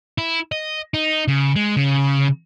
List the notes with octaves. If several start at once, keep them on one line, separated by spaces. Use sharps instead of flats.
E4
D#5
D#4
C#3
G#3
C#3